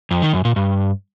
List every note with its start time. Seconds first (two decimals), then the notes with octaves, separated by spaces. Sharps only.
0.11 F2
0.22 D#3
0.33 F#2
0.45 A#2
0.56 G2